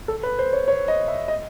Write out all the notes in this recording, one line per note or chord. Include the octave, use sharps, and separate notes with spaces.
A4
B4
C5
C#5
C#5
D#5
E5
D#5